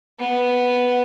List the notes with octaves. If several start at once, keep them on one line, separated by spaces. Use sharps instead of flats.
B3